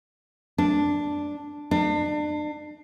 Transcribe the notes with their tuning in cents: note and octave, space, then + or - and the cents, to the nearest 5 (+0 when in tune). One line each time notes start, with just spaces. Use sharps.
D4 +0
D4 +35